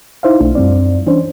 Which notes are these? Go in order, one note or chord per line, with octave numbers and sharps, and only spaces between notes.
D#4 E4 C5 E5 F5
B1 A3 D4 E4
F#2 G3 C4 D5
E3 C#4 D4 C5